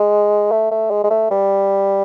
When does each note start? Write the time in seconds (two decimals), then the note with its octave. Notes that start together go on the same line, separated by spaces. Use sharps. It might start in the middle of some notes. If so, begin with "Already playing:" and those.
Already playing: G#3
0.51 A3
0.71 A3
0.91 G#3
1.04 G#3
1.10 A3
1.31 G3